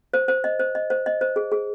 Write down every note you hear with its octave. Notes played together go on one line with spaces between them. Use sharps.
C5
C5
D#5
C5
D#5
C5
D#5
C5
G#4
G#4